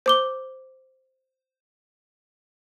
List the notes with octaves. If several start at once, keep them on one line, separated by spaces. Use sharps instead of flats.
C5 D6 G7